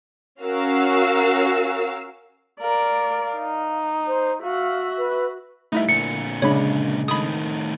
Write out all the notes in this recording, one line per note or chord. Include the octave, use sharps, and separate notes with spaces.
C#4 F#4 A#4 F5 E6
A#4 D5 F5
D#4
C5
F#4 E5 F5
B4
G3 A3 D#4 E4 E5
A#2 D3 C#7
C#3 G#3 D4 C#5 B5
A2 D#3 B5 D#6